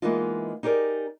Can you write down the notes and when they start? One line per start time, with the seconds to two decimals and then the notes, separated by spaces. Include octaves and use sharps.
0.02 E3 G#3 A#3 B3 D#4 F4
0.63 D#4 G4 G#4 A#4 D5